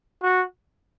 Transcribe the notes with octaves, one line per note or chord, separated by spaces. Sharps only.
F#4